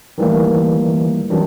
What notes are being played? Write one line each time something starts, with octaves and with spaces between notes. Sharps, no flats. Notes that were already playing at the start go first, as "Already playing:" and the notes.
D#3 E3 G3 A3 A#3
D#3 E3 F#3 G3 C#4 D4